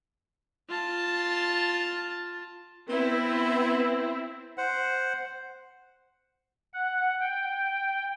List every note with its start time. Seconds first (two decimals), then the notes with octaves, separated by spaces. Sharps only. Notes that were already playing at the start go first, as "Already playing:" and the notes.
0.69 F4 A5
2.89 B3 C4 E4
4.58 C5 F#5
6.73 F#5
7.21 G5